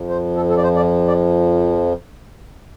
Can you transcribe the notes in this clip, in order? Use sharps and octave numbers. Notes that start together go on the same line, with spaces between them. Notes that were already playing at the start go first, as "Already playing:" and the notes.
Already playing: F2 F3
C5
A4
A4
D5
C5
D5
D5